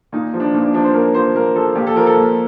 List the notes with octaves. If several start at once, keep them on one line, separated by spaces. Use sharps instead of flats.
A#2 D#4
F3
D4
A#2 D#4
D4
F3 D4
C5
A#2 A#4
F3 C5
A#2 A#4
F3 A4
A#2 G4
A4
F3 A#4
A4
A#2